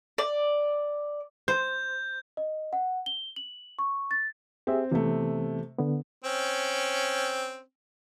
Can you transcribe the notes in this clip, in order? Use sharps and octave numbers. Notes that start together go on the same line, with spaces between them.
D5
C5 G6
D#5
F#5
G7
F#7
C#6
A6
C4 G4 G#4 E5
C3 E3 A3 B3
D3 B3
C4 C#4